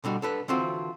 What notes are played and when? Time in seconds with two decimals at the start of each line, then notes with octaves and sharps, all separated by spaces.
0.04 B2 D3 G3 F#4
0.22 D3 A4 B4
0.48 D3 E3 C4 F4 F#4